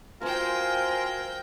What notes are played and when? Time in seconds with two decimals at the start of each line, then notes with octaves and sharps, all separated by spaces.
0.21 C4 F4 F#4 A#4 C5 G5 G#5